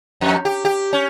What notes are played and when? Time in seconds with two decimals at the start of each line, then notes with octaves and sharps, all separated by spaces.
0.21 F2
0.45 G4
0.65 G4
0.93 C#4